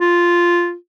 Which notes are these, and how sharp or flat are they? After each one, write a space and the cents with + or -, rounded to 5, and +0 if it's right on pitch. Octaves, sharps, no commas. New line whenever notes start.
F4 -5